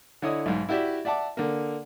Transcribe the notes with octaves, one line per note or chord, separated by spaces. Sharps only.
D3 E4 C#5 D#5 D#6
B1 G#2
E4 F#4 G4 D5 E5
D5 E5 F#5 A5 D6
D3 A#3